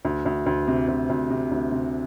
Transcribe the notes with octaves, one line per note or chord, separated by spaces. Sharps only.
D2
D2
D2
C3
D2
D2
C3
D2
C3